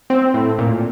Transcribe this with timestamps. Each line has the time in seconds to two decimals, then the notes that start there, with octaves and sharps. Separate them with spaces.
0.10 C4
0.34 A2
0.59 A#2